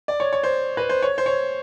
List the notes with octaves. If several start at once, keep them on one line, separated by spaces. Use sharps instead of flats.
D5
C#5
C#5
C5
B4
C5
C#5
C5
C#5